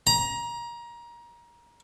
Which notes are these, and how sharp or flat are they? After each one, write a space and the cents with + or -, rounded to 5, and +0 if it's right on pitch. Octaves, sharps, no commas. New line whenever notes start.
A#5 +25